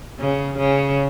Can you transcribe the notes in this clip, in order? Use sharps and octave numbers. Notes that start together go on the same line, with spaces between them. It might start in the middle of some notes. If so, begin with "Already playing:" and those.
C#3
C#3